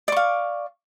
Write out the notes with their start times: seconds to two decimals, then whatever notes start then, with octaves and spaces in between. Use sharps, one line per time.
0.08 D5
0.12 C#6
0.16 F5